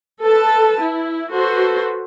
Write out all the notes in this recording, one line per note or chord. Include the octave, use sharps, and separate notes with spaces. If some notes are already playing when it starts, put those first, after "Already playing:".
A4 B4 A5
E4
F#4 A4 B4 C5